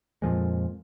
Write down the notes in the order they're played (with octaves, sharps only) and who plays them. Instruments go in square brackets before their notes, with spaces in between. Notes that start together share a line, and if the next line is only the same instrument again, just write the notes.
[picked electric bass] F2 A#2 F3 G#3